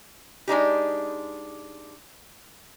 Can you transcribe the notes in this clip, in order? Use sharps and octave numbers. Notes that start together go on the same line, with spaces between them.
G#3 D4 D#4 G4